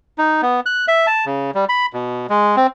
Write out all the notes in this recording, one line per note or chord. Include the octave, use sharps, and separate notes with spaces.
D#4
B3
F#6
E5
A5
C#3
G3
B5
B2
G#3
C4